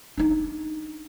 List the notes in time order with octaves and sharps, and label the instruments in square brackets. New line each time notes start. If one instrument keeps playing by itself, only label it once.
[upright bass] D4 D#4